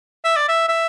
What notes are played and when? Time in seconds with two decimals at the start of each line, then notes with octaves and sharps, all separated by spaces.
0.25 E5
0.37 D5
0.49 E5
0.69 E5